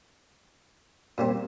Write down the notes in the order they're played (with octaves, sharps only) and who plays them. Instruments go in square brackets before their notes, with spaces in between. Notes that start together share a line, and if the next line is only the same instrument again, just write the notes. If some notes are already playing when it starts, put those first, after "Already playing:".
[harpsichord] A#2 G3 C4 [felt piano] A#3